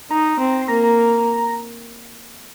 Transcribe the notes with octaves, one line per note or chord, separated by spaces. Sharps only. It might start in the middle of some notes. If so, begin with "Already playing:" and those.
D#4 A#5
C4
C6
A#3 A#5
A#5